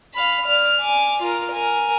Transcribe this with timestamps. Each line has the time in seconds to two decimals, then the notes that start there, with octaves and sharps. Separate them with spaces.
0.14 F5 B5
0.46 D5 F6
0.80 G#5 D6
1.23 F4 A#4
1.52 A#4 G#5